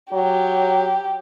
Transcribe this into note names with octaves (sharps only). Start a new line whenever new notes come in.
F#3 G4